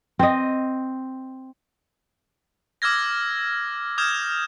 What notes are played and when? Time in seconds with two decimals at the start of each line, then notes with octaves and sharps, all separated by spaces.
0.19 C4 D#5
2.82 D6 E6 F6 G#6 A#6
3.98 D#6 F6 G6 G#6 E7